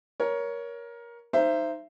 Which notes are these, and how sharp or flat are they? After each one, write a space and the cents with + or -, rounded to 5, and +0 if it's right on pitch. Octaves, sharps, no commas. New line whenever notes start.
A#4 +20 C#5 +15
D#4 +0 C5 +0 E5 +30